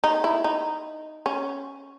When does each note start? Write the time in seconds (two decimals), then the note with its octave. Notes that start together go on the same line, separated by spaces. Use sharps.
0.04 D#4
0.24 E4
0.44 D#4
1.26 C#4